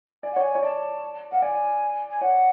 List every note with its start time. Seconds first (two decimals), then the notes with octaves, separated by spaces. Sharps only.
0.23 D5 G#5
0.32 F#5
0.36 C#5
0.41 G#5
0.55 C#5
0.63 D5 A5
1.31 F5 F#5
1.42 D5 G#5
2.10 G#5
2.21 C#5 F#5